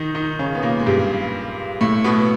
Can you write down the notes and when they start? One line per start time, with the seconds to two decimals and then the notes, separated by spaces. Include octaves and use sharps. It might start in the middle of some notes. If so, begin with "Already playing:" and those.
Already playing: D#3 D#4
0.15 D#3 D#4
0.39 C#3 C#4
0.55 B3
0.62 A#2 A#3
0.79 G#3
0.86 G2 G3
1.81 A2 A3
2.04 B2 B3